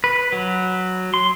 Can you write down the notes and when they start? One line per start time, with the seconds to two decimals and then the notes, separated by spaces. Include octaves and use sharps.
0.04 B4
0.32 F#3
1.14 C6